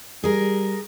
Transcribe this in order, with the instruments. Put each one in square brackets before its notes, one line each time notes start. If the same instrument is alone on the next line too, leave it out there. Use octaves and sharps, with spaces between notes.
[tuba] G3 [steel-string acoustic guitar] G#4 A#4